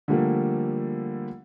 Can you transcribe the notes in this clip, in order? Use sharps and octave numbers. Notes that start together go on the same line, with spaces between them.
D3 F3 G3 A3 A#3